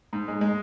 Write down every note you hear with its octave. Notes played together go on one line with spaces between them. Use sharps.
G#2
G#3
G#3